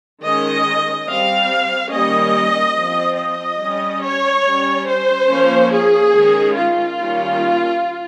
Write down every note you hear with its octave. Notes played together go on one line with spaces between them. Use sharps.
D#3 G#3 C#4 D#5
G3 C4 F5
D#3 G3 A#3 C#4 D#5
F3 C4
D#5
G3 C#4
C#5
G3 C#4
C5
F3 A#3 C#4
G#4
D#3 G#3 C#4
F4
D#3 G3 A#3 C#4